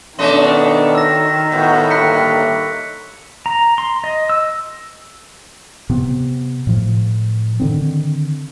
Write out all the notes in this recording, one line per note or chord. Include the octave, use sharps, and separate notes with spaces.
B2 D#3 A3 C#4 D4 D#5 C6
E6 A#6
A2 B3 F#4
G2 D3 A#3 F#6 B6 C#7
A#5
C6
D#5
E6
C3 B3
A2 F3
D3 D#3 C4